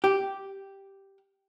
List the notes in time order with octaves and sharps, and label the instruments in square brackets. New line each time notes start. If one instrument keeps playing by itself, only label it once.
[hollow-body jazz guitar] G4